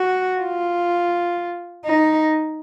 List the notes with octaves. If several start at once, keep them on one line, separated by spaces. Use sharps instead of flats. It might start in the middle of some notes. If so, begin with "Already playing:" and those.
Already playing: F#4
F4
D#4